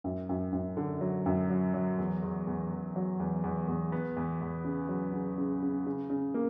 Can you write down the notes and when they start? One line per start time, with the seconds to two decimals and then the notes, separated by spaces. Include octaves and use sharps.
0.04 F#2
0.29 F#2
0.53 F#2
0.77 D3
1.01 F#3
1.26 F#2
1.50 F#3
1.74 F#3
1.99 E2
2.23 E2
2.47 E2
2.71 E2
2.96 F#3
3.20 E2
3.44 E2
3.68 E2
3.92 B3
4.17 E2
4.41 E2
4.64 C#3
4.89 F#3
5.13 C#3
5.38 C#3
5.62 C#3
5.86 C#3
6.10 C#3
6.34 A#3